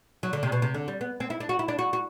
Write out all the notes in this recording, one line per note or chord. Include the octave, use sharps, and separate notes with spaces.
F#3
D3
C3
B2
C3
D3
G3
B3
C4
E4
D4
F#4
E4
D4
F#4
F#4